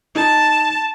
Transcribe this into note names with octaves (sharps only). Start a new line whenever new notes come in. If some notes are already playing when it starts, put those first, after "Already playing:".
D#4 A5